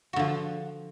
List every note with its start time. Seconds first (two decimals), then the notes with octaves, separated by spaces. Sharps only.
0.13 F#4
0.16 D3
0.20 F3